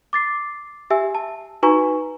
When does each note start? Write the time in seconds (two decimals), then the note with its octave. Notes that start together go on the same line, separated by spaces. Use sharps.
0.13 D6 A6 C7
0.90 G4 E5 G#5 E6
1.15 A5
1.63 D#4 F#4 B4 G#5 A#5 C#6